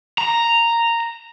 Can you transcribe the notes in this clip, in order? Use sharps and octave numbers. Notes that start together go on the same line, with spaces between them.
A#5